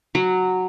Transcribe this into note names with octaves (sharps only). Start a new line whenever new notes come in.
F#3